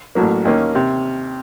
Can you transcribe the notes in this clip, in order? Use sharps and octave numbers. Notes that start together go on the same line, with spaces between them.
A1 A2 F#3 A#3
D#2 D#3 A#3 C#4
C3